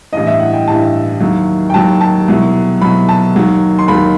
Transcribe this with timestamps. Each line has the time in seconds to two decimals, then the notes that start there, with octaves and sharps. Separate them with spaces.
0.13 A1 G2 E3 D#5
0.27 E5
0.40 F#5
0.53 G5
0.67 A1 G2 E3 A5
1.20 D#2 D#3 F#3
1.70 G5
1.74 D#2 D#3 F#3 A5
2.01 A5
2.28 C2 B2 F#3
2.82 C2 B2 F#3 B5
3.09 A5
3.35 D#2 D#3 F#3
3.79 C6
3.88 D#2 D#3 F#3 B5